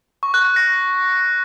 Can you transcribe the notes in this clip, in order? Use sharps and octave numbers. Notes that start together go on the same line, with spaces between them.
C#6
F#6
F#6
A#6